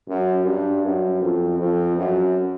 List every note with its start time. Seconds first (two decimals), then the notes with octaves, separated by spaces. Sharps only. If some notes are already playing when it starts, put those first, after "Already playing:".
0.08 F#2
0.45 G2
0.84 F#2
1.22 F2
1.59 F2
1.97 F#2